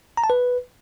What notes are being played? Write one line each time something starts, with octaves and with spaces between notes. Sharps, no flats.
A#5
A5
B4